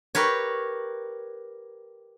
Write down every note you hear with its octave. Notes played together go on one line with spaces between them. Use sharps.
G4 A#4 B4 C#5